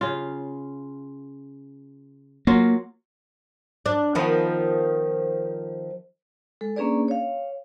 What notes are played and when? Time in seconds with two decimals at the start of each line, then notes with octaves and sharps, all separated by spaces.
0.01 C#3 F4
2.47 F#3 A#3 F4
3.86 D4
4.15 D#3 F3 B3
6.61 G#3 A4
6.76 A#3 C#4 D4 G#4 B4 D5
7.08 C#5 F5